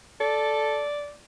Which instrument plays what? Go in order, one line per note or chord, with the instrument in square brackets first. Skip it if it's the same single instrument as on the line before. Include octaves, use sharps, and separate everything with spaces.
[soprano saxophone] A4 [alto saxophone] D5